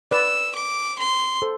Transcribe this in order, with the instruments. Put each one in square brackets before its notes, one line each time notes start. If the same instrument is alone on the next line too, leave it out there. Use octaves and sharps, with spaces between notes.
[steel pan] B4 D5 [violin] E6
[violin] D6
C6
[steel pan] A4 C5